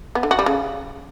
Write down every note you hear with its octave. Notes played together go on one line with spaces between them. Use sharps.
B3
D3
F#4
G3
C#3